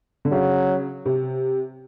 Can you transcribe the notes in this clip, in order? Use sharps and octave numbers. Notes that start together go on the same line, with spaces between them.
D3
C#3 F#3
C3